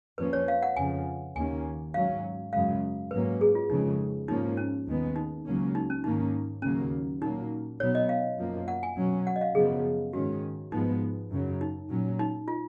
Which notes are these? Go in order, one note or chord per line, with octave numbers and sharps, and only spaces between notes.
F2 F3 A#3 C#4 B4
C#5
F5
F#5
F2 C#3 F3 G#5
D#2 D#3 A#3 C#4 G#5
G#2 F#3 C#4 F5
F#2 C#3 G#3 F5
G#2 F#3 A#3 C#4 B4
G#4
F4
F2 C#3 G#3 D#4
G#2 F3 A#3 C#4 D#4
C#4
D#2 D#3 G#3 B3
D#4
C#2 C#3 F#3 A#3 C#4
D#4
C#4
G#2 D#3 A#3 C#4 D#4
D#2 C#3 F#3 A#3 C#4
A#2 F#3 A#3 D#4
B2 F#3 B3 C#5
D#5
F5
F#2 F3 A#3
F#5
G#5
B2 F#3 C#4
F#5
D#5
F5
F#2 C#3 F3 B3 G#4
G#2 D#3 G#3 C#4 F#4
G#2 F3 G#3 B3 D#4
F#2 C#3 F#3
D#4
A#2 F#3 C#4
D#4
F4